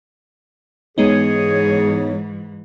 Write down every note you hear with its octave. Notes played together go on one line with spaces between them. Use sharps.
G#2 E3 G#3 B3 D#4 G#4 C#5